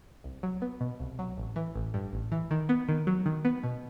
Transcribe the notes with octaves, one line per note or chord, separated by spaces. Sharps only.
C2
F#3
B3
B2
C2
F#3
A1
E3
A1
G2
A1
E3
D#3
B3
D#3
F#3
D#3
B3
B2